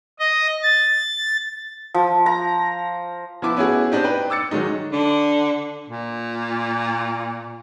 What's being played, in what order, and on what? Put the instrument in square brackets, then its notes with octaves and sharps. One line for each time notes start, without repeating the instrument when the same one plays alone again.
[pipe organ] D#5
A6
[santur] F3
A#5
[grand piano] F3 B3 E4 D6
B3 C#4 E4 F#4 G#4
C4 D4 D#4 G4
B4 G5
D6 E6 A6 C#7
D#3 F#3 G#3 D#4
[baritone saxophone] D3
A#2